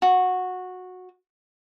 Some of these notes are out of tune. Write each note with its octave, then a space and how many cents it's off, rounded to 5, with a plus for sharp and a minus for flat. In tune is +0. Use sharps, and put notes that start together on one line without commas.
F#4 -15